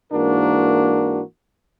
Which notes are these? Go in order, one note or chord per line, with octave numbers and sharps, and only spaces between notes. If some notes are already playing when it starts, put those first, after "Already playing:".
G#2 E3 A#3 D4 F#4 A#4